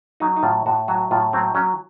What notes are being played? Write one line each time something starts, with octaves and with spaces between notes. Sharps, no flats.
F#3 D#4
D#4
A2 F4
A2 F#4
F#3 F#4
A2 F4
F#3 C4
F#3 C#4